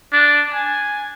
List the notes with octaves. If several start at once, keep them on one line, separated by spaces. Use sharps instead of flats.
D4
G#5